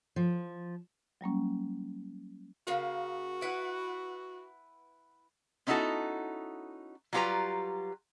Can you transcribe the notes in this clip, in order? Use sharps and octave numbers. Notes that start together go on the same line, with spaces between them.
F3
F#3 G3 A#3 C#4
C#3 A#3 F#4 F5
E4 B4 F#5
B3 C#4 D#4 E4 F#4 A4
F#3 G3 F4 G4 B4 A#5